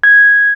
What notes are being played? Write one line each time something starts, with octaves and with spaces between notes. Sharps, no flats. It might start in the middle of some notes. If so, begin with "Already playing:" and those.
G#6